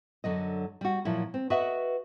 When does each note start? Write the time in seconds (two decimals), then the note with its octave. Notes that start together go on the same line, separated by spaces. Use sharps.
0.24 F#2 D3 F#3 D#5
0.81 G3 F#4
1.05 A#2 F3 F#3 E4
1.34 C4
1.50 F#4 B4 D#5 E5 F#5